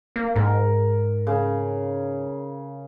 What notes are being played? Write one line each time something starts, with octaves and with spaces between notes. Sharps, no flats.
A#3
G#2 A#4
C#3